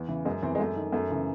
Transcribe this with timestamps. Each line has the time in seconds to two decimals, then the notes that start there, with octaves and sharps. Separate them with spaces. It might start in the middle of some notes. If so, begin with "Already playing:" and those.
Already playing: E2
0.08 C#3 E3
0.25 F#2 G#3
0.42 E3 C4
0.55 G#3
0.59 F#2 A3
0.76 D#3
0.92 F#2 A3
1.10 C#3 E3